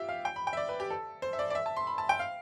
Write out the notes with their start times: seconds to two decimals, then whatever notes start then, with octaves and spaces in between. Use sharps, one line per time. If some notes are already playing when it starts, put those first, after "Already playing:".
Already playing: F4 G4 E5
0.09 F5
0.25 G5
0.36 B5
0.47 G5
0.53 E5
0.57 D5
0.69 B4
0.80 G4
0.90 A4
1.22 C5
1.33 E5
1.39 D5
1.50 D5
1.55 E5
1.66 A5
1.76 C6
1.87 B5
1.98 A5
2.09 G5
2.19 F5